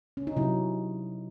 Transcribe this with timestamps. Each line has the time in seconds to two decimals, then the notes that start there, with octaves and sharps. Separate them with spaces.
0.17 C#4
0.27 D#4
0.36 C3 F#3 C#4 E4